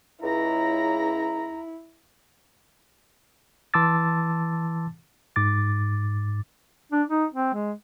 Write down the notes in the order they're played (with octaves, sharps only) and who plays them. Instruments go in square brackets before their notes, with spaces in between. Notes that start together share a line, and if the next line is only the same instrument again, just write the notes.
[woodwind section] C#2 A#5 [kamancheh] E4
[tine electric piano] E3 A5 C6 D6 E6 A6
G#2 D6 A6
[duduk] D4
D#4
C4
G#3